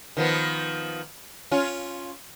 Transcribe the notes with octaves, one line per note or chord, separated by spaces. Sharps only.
D#3 F3 B3
C#4 F4